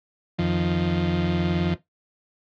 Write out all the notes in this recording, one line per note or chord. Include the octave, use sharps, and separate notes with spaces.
F2 D#3 F3